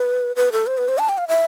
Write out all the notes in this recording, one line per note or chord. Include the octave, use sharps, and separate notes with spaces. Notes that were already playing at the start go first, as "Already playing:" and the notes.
Already playing: B4
B4
A4
C5
B4
C5
A5
G5
F5
E5